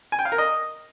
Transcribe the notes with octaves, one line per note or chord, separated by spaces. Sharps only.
G#5
G5
F5
A#4
D#5